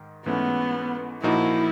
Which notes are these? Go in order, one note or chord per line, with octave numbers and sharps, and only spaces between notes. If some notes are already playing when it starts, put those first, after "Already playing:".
Already playing: G#2 D#3
G#2 E3 A3 B3 C#4
A#2 F3 A#3 D#4 E4 F#4